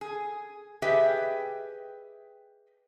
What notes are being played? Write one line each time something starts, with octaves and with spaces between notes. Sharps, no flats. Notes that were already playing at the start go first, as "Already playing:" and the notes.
G#4
G4 G#4 B4 D#5 E5 G5